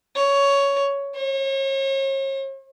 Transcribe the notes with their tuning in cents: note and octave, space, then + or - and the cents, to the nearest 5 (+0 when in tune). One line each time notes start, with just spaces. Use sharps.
C#5 +10
C#5 -40